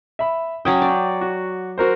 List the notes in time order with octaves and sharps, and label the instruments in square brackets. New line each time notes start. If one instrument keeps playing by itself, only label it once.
[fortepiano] E5 B5
[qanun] F#3 C#4 G5 [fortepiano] D#6
[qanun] D5
[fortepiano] F#4
F#4 A#4 C5